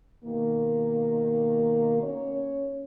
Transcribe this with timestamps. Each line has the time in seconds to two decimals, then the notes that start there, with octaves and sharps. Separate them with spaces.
0.24 B2 D#3 A#3
2.02 C#4 C#5